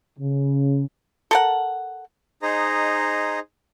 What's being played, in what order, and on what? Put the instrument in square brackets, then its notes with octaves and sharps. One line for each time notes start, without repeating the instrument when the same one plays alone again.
[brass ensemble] C#3
[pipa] A4 A#4 F#5
[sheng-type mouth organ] D#4 G#4 C5 D#5 A#5